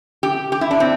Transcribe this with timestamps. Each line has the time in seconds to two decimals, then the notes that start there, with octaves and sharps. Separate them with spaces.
0.23 G4
0.52 G4
0.61 E4
0.71 D4
0.80 C4